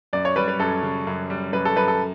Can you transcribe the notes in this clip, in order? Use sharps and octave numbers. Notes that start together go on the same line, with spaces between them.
F#2 D5
C#5
G3 B4
B4
F#2 A4
C#3
F#2
G3
F#2 B4
A4
F#2 B4
A4